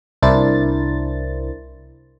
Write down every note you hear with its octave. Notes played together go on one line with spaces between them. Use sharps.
C2 D4 E4 A#4 C5 A6